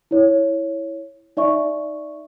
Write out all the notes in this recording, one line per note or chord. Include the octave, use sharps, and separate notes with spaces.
E4 C#5
D#4 D5 E5 C#6